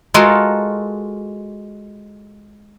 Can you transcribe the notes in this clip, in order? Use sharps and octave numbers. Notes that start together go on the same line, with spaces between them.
G#3 F4 F#4 A4 A#4